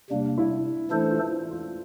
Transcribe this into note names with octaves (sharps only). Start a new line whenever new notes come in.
C3 G3 A#3 D4
E4
E3 A3 D4 E4 A4 C5
F4
E4
F4